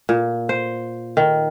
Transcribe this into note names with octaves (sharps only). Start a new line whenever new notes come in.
A#2
C5
D#3